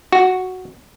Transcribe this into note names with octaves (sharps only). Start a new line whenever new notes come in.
F#4